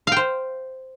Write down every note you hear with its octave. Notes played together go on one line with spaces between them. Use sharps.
C5 F5 G5